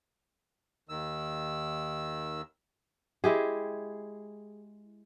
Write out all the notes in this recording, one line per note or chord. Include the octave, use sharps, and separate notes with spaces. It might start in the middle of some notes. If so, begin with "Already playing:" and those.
D#2 D#3 E6
G#3 E4 G4 G#4